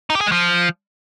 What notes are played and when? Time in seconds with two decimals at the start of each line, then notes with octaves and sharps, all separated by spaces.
0.10 D#4
0.15 G4
0.21 G#4
0.26 G#3
0.32 F3